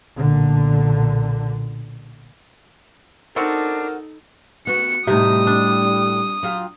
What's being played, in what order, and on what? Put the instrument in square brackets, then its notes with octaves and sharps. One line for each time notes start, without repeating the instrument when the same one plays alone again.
[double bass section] B1 A#2 D3
[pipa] C4 F#4 [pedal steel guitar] D4 [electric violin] D#4 A4 [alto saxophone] A#4
[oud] B3 [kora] F#4 F#5 [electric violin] C#7
[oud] A2 E5 [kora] C3 D#4 [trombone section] G3 [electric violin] D#6
[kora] D4
[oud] F#3 F4 G4